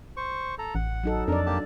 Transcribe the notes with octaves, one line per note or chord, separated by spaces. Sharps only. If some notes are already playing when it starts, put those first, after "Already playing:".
C5 C#6
A4 A#5
A1 F#5
F#3 D#4 A4
F2 D4 A#4 D5
A#3 G4 A5